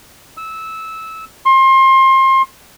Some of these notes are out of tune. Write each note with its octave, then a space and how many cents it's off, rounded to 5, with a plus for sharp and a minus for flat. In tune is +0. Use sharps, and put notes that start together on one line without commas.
E6 -15
C6 +30